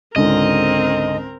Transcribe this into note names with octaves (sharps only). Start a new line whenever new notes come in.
C#2 G#2 D3 C4 A#4 D#5